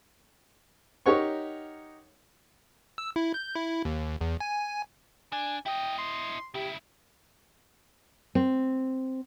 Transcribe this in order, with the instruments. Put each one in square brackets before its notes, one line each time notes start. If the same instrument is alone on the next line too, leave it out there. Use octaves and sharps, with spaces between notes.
[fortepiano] D#4 G4 A#4 C#5 F#5 C#6
[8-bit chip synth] E6
E4
G6
E4
D#2
E2
G#5
[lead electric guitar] D4 [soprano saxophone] G#5
[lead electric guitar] E4 D#5 [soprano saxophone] G5
[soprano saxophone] C6
[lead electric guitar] C#3 E4 [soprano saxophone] G4
[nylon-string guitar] C4